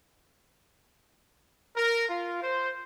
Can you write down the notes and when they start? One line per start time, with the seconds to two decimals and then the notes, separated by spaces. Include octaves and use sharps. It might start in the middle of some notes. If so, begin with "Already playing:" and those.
1.76 A#4
2.09 F4
2.42 C5